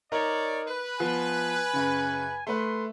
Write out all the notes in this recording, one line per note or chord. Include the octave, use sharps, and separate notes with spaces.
D#4 A#4 C#5 D5
B4
F3 B3 G#5
F#2 C#3
A3 B4 C6